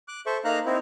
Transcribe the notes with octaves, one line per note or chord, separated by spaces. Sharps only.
D6 F#6
A4 C5 E5 C#6
A#3 D#4 F5 A#5 F#6
C4 D#4 E4